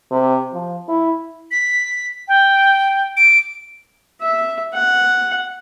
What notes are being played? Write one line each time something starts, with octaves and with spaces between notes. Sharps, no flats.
C3
F3
E4
B6
G5
D7
E5
F#5